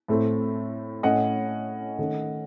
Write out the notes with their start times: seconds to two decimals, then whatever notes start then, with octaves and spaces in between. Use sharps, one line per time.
0.08 A2 A3 C4
1.03 A2 A3 C#4 D#5 F#5
1.98 D#3 A3 C#4